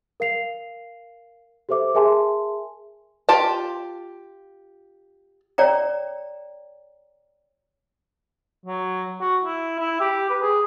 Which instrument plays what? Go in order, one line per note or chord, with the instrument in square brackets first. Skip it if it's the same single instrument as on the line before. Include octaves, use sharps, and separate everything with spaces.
[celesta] A#4 F5 C7 F7
G4 A4 C5 E5 D6
G#4 A#4 E5 G#5 A5 C6
[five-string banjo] F4 G4 A5
[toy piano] C#5 D5 G5 A#5
[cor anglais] F#3
F#4
E4
E4
G4
B4
G#4